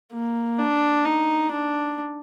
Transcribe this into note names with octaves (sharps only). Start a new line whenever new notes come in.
A#3
D4
D#4
D4